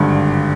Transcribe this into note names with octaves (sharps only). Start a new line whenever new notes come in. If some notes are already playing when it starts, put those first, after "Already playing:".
Already playing: G#1 G2 D3